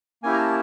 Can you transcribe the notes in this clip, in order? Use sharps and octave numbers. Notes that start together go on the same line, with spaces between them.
A#3 C#4 E4 G4 G#5
A#5
A5